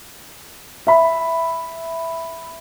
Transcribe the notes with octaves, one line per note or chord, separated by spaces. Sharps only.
E5 B5